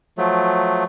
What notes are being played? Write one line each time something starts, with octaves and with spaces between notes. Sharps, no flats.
F3 F#3 A3